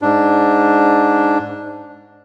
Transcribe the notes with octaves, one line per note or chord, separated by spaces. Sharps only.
G#2 D4